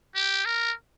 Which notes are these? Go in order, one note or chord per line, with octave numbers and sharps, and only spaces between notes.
G4
A#4